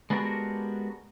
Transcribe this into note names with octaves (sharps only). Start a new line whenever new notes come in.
G#3 B3 D4 F#4 G4 A#4